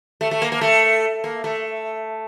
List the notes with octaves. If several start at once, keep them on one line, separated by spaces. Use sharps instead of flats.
A3
A3
A#3
A#3
A3
A#3
A3